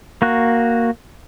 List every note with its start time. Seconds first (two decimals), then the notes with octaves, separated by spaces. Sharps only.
0.22 A#3 F#4 F#6